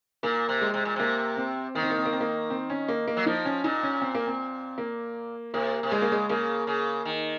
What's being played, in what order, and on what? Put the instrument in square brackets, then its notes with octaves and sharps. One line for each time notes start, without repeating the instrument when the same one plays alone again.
[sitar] A#2 [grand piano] A#3
[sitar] C3
[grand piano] G#3
[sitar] C3
A#2
[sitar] C3 [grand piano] A#3
[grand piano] C4
[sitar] D#3 [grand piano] A#3
[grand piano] C4
A#3
C4
A#3
C4
A#3
C4
C#4
A#3
A#3
[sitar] F#3
[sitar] F3 [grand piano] D#4
[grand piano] C#4
[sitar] A#2 [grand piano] D#4
[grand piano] C#4
C4
A#3
C4
A#3
[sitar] C3 [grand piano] A#3
[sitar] C3
[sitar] C#3 [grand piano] G#3
[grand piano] A#3
G#3
[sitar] C#3 [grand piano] A#3
[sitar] C#3
D#3